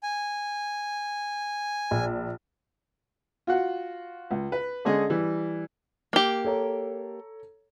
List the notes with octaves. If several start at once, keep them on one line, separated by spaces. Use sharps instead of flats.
G#5
A#1
F4 F#4 F#5
C#2
B4
D3 G#3 C#4 G#4 D#5
E3 G3
A#3 G4
A4 C#5 A#5